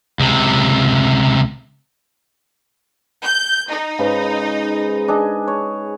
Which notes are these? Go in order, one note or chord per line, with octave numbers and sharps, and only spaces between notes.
C#2 C3
G6
D#4
G#2 C#3 B4
D4 G#4 D#5
C#5